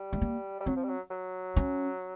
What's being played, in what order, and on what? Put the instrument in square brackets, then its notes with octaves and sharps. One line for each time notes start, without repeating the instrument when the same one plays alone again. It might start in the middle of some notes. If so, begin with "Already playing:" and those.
Already playing: [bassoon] G3
[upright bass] A3
A#3
[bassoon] G3
[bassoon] F#3 [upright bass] C4
[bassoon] F3
G3
F#3
F#3
[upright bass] C#4